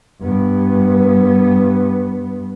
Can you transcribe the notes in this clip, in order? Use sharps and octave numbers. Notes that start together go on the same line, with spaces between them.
G2 B3